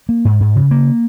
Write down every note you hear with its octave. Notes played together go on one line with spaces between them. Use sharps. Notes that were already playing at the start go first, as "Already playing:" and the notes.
A#3
G#2
G#2
C#3
A#3